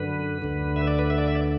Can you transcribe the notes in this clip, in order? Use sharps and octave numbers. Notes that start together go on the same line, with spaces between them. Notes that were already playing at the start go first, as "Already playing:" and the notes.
Already playing: F#2 D3 B4
D2 D3
E5
D5
B4
E5
D5
E5
D5